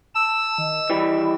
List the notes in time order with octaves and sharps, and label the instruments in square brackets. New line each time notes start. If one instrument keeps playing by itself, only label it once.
[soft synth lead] A5 [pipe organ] E6
[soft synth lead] D#3 [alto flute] D#5
[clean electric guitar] E3 G3 [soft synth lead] B5